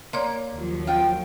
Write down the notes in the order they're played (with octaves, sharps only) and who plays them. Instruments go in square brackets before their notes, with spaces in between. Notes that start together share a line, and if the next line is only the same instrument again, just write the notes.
[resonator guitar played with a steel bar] A#3 [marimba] C#5 D5 C6
[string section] D#2 F3 F#3
[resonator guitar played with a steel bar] F4 G5